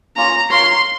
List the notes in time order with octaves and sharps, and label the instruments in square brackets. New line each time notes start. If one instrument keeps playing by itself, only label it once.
[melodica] A#3 C#4 F4 [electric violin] A#5
[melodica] F4 A#4 C#5 [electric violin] C6